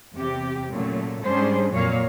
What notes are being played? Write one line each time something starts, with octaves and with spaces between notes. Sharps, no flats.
E2 C3 G4
A#2 C#3 F#3 A3
G#2 G3 C#4 D4 G#4 C5
F2 A#2 F#3 A#3 C#5 F5